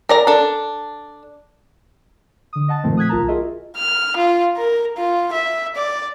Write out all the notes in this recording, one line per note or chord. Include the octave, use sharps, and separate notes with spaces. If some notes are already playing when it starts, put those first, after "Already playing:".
A#4 D5 A#5
D4 A4
D3 D#6
D#5 F#5 A5 A6
G2 A#2 D#3 F3 A3 C4
D#6 F#6 G#6 B6
B1 F4 A#4 A5 A#5
F4 F#4 G#4 A#4 D#5 E5
F6
F4
A#4
F4
E5
D5